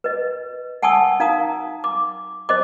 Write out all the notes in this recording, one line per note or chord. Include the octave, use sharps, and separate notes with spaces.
B4 D#5
F#5 G#5 A5 C#6 D#6 E6
D#4 F5 A#5 D#6
D6
C5 D#5 D6